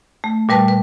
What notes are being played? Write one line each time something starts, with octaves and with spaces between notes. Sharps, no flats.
A3
A#2 G3 B4 A5
B4